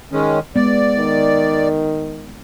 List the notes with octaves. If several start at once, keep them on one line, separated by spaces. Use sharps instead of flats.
D#3 G#3 C#4
G#3 B3 D5
D#3